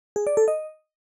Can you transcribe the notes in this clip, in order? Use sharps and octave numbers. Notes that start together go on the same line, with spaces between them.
G#4
D5
A4
D#5